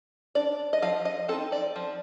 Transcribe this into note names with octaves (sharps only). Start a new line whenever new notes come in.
D4 D5
D#5
F3 F5
D#5
C4 D#4 A4
D5
F3